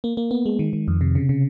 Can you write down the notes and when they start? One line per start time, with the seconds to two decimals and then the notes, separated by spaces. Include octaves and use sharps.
0.04 A#3
0.17 A#3
0.31 B3
0.46 G#3
0.59 D#3
0.73 D#3
0.88 F2
1.01 C3
1.15 C#3
1.29 C#3